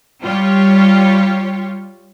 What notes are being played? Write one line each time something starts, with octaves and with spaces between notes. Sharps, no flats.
G3 F4 G4 C#5